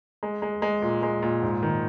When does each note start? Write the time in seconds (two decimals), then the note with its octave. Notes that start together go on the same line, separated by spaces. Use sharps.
0.23 G#3
0.42 G#3
0.62 G#3
0.82 A#2
1.03 G#3
1.23 A#2
1.43 G#2
1.63 D#3